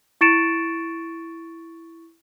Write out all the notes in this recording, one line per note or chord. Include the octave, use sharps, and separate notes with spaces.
E4 C#6 A6 C#7 D7 E7